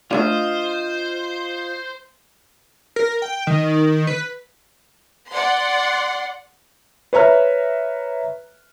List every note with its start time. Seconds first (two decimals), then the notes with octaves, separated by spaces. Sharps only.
0.11 A3 C#4 D4 F4 C5 D#5 F6
2.96 A#4
3.22 G5
3.47 D#3
4.07 B4
5.31 D5 F#5 C6
7.13 B4 C#5 E5 A#5 F6